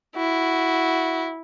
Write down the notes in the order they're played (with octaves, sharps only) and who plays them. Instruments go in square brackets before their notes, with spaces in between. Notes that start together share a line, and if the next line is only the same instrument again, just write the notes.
[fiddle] E4 [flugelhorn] F#4